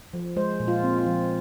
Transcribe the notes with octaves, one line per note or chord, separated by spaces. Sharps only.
F3
G#3 C5
A#2
F4
C4
F4
F3